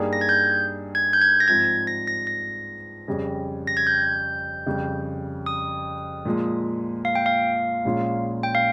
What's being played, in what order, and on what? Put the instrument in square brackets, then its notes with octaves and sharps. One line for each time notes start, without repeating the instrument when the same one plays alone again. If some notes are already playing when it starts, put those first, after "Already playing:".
Already playing: [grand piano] G2 G3 A#3 D#4 G#4
[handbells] A#6
G#6
G6
G#6
G6
G#6
A#6
[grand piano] G#2 F3 C4 [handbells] G#6
[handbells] A#6
A#6
A#6
[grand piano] F2 C#3 G3 C#4 G#4
[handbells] A#6
G#6
G6
[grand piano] F2 C#3 G3
[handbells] D#6
[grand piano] A#2 F3 G#3
[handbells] F5
G5
F5
[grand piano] A#1 A#2 G#3 C#4 F4
[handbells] G5
F5